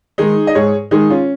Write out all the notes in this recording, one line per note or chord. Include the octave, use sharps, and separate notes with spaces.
D#3 G#3 D#4 G#4
D#5
G#2 G#4 C#5
D#3 G#3 D#4 G#4
C#4 F4